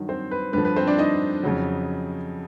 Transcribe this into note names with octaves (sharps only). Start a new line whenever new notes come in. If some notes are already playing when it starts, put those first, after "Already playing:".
Already playing: G2 D#3 F#3
C4 C5
B4
G2 D3 F3 B4
B4
C4 C5
D4 D5
D#4 D#5
F2 C#3 F#3